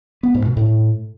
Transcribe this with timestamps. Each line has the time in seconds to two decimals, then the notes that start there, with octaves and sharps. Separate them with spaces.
0.23 B3
0.34 G#2
0.46 B2
0.57 A2